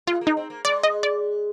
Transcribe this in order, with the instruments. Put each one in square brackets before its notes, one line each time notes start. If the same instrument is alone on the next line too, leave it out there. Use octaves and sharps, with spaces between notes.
[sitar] G#3 [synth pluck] F4
[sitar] A#3
[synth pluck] D#4
[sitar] C4
A#3
[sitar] G#3 [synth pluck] D5
[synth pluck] D#5
D5